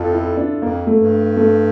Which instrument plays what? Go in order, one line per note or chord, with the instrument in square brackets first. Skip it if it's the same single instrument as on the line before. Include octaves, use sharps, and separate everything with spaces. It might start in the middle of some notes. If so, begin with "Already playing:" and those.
Already playing: [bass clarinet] F2 [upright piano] F4 A4
[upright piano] E4
D4
[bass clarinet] F2 [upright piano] A#3
[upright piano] A3
[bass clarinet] G2
[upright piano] A3